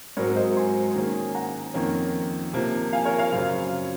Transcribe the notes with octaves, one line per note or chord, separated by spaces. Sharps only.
G#2 F#3 C4 A#4 C#5
C5 D#5
G#5 C6
D#3 A#3 C#4 G#4
F#5 A#5
F2 D#3 A#3 C#4
C3 F3 A#3
F5 G#5
A#4 C#5
C#5 F5
F#2 C#3 F#3 C4 F4